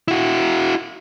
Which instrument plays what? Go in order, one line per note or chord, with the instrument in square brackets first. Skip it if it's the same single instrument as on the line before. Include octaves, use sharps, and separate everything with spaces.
[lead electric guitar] E4 F#4